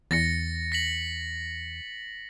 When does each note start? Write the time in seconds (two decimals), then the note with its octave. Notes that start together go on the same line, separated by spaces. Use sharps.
0.11 E2 A6 A#6 C#7
0.72 A#6 B6 F#7